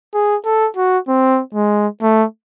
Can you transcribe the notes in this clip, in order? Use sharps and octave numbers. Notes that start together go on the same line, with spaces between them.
G#4
A4
F#4
C4
G#3
A3